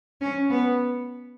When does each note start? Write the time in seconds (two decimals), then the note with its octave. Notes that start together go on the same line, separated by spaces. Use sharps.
0.21 C#4
0.50 B3